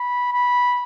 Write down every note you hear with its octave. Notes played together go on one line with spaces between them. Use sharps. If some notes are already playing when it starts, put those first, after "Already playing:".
Already playing: B5
B5